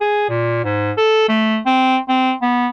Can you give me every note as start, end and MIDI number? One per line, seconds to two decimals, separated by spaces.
0.01 0.24 68
0.29 0.59 46
0.64 0.92 44
0.98 1.27 69
1.29 1.58 57
1.66 1.98 60
2.09 2.33 60
2.42 2.68 59